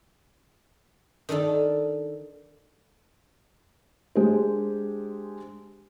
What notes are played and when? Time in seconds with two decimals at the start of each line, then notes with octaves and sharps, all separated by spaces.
1.29 D#3 D4 D#4 A4
4.15 G#3 D4 G4 C5